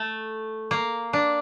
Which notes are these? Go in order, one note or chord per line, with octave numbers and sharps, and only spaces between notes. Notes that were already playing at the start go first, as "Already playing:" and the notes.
Already playing: A3
A#3
D4